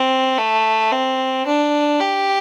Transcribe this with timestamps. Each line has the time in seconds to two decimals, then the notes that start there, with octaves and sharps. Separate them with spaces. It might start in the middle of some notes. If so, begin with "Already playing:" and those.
Already playing: C4
0.38 A3
0.92 C4
1.46 D4
2.00 G4